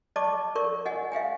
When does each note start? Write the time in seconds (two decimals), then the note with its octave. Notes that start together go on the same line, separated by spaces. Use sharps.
0.16 D5 D#5 A5 C#6 D6
0.55 A#4 D5 C#6
0.86 D#5 F#5 G#5
1.12 E5 F5 G5 G#5